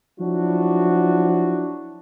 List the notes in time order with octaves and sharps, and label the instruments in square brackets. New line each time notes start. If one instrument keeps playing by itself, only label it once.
[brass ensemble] F3 F#3 D4 E4 F#4